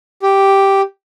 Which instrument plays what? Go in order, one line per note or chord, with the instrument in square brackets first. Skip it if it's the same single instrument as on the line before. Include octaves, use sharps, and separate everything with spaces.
[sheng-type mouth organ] G4